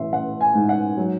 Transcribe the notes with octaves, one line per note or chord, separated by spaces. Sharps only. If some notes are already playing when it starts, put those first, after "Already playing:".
Already playing: A1 E3 E5 C6
A1 F#5
G#5
G#2
F#5
F#3